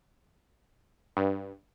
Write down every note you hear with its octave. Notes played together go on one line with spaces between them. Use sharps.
G2